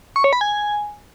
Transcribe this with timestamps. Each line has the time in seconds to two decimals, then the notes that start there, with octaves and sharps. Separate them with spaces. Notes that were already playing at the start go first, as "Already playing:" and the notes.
0.16 C#6
0.24 C#5
0.33 B5
0.41 G#5